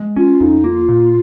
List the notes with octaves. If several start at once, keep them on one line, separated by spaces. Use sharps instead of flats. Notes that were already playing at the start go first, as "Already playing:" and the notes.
Already playing: G#3
C#4 F4
F2 D#4
A#3 F4
A#2